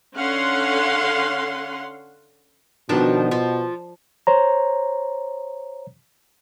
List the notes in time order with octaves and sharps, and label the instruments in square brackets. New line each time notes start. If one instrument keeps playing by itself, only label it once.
[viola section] D3 C#4 F5 F#5 C6
[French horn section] B2 [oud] D#3 F3 D4
[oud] F3
[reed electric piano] C5 C#5 A#5